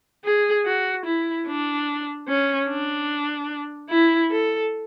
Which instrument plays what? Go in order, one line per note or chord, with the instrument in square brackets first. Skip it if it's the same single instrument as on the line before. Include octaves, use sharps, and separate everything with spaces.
[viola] G#4
F#4
E4
D4
C#4
D4
E4
A4